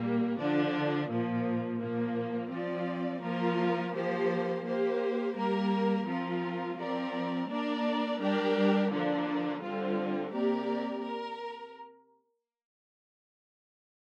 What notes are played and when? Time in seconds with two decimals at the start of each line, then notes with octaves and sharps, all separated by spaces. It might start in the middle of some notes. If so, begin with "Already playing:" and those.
Already playing: A#2 G3 A#3
0.39 D3 F3 D4
1.09 A#2 F3 A#3
1.81 A#2 F3 A#3
2.51 F3 C4 F4 D5
3.22 F3 A#3 F4 A#4
3.93 F3 A#3 G4 C5
4.64 A#3 G4 C5
5.35 G3 A#3 G4 A#4
6.07 F3 C4 F4 A#4
6.77 F3 C4 A#4 D5
7.48 A#3 D4 A#4 D5
8.20 G3 D4 G4 A#4 D5
8.90 D3 F3 A#3 D4
9.61 D3 G3 C4 F4
10.32 C3 A#3 G4 A#4 D5
11.03 A#4